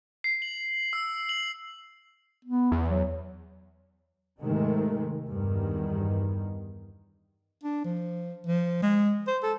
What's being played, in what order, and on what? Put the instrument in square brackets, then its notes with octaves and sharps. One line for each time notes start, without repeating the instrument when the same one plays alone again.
[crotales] C7
F#7
E6
F#7
[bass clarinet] B3
[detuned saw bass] E2
[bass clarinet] F#3
[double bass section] G#2 C3 D#3 G#3 A3
E2 G2 D#3
[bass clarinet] D4
F3
F3
G#3
C5
A4